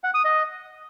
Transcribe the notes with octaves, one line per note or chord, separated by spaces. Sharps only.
F#5
D#6
D#5